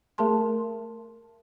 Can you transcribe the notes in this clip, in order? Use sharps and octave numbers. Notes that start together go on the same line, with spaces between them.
A3 G#4 A#4 A5 C6